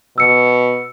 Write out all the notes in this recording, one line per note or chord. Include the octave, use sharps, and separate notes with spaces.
B2 E6 C#7